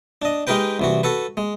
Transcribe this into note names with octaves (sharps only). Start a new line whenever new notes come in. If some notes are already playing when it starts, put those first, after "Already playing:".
D4 D#5
G#3 D#4 G4 A#4 B4 G5
C2 E3 F#4
F#4 A4 B4
G#3